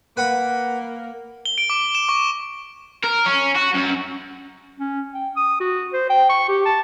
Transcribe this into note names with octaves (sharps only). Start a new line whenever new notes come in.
A#3 B4 F#5 B5
G7
D7
D6
E7
C#6
A#4
C#4
F#4
F#2
C#4
G5
D#6
F#4
C5
G5
C#6
G4
A5